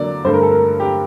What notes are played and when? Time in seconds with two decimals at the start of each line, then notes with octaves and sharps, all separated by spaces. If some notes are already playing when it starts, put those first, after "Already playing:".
Already playing: D3 F#3 A#3 D5
0.24 G2 D3 A3 C5
0.34 A#4
0.43 A4
0.51 A#4
0.80 G4